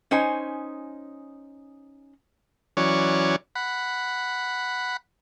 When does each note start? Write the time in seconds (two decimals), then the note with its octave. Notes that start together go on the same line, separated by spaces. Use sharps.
0.11 C#4 D#4 C5 G#5
2.77 E3 F#3 C#4 C#5 D5
3.55 F#5 B5